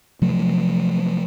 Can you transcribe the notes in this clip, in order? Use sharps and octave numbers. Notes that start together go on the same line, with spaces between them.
C3 F3 F#3 A3